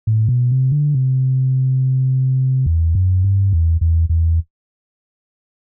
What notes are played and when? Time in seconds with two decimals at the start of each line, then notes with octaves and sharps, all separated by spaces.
0.07 A2
0.29 B2
0.51 C3
0.72 D3
0.94 C3
2.66 E2
2.95 F#2
3.24 G2
3.53 E2
3.81 E2
4.09 E2